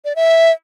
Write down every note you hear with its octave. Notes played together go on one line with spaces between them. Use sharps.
D5
E5